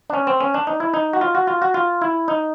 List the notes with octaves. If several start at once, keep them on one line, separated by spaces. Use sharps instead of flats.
D4
C#4
C4
C#4
D4
D#4
E4
D#4
F#4
F4
F#4
F4
F#4
F4
E4
D#4